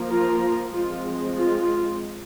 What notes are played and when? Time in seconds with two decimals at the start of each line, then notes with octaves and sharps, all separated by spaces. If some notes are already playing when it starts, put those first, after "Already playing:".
Already playing: F3 A#3
0.11 F4 A#4
0.73 F3 G#3 C4 F4
1.36 F4